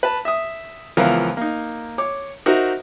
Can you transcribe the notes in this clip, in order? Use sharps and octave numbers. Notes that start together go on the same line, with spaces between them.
B4 A5
E5 D#6
C#2 E3 F3 B3 A#4 F5
A#3 D#4
C#5 D6
D#4 F#4 A#4 C5 E5